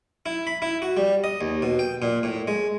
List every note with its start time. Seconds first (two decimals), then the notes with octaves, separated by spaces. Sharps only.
0.26 E4
0.47 B5
0.62 E4
0.82 F#4
0.97 G3
1.24 D#5
1.41 D#2
1.62 B2
1.79 G5
2.02 A#2
2.23 A2
2.48 G#3